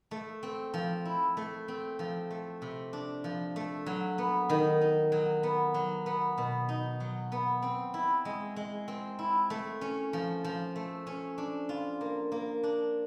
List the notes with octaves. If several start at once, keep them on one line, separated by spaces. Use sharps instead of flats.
A3
C4
F3
E4
A3
C4
F3
A3
C3
D4
F3
A3
F#3
B3
D#3
D#4
F#3
B3
F#3
B3
B2
D#4
F#3
B3
C4
E4
G#3
G#3
C4
E4
A3
C#4
F3
F3
A3
C#4
D4
F4
A#3
A#3
D4